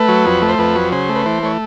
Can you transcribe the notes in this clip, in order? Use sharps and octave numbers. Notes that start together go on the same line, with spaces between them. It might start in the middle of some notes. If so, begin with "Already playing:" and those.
Already playing: A3 B4
F#3
F2
A3
C5
F2 B4
F#3
C#3 C5
A3
B4
E3 C5
A3 C#5